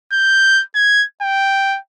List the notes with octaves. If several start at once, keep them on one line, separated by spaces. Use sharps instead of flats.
G6
G#6
G5